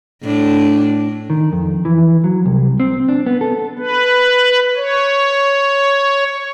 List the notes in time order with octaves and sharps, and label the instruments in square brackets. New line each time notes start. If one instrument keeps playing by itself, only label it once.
[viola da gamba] A2 D4
[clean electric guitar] D#3
F2
E3
F#3
C2
C4
D4
B3
A4
[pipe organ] B4
C#5